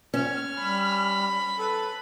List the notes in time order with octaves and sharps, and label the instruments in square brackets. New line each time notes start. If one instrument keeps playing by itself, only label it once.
[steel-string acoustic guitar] C#4 [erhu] F6
[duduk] G3 [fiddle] B5
[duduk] A4 [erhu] B4